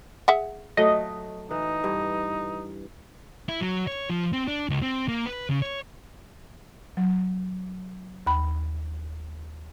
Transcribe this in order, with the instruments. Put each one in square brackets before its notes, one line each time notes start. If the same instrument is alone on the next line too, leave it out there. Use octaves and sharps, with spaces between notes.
[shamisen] G#4 E5 F#5
[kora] F#3 A3 [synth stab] D#5
[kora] E3 [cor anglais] D#4
[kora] G2
[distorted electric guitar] E4
F#3
C#5
F3
C4
D4
C#2
C4
A#3
B4
C#3
C#5
[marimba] F#3
D#2 B5